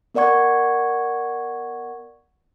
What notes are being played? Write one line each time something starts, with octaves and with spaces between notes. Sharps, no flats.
B3 A#4 D5 F#5 C#6 G#6